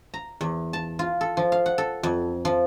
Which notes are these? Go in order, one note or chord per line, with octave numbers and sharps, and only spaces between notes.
A#5
E2
A5
F4
A4
F3
F5
F#5
A4
F2
F3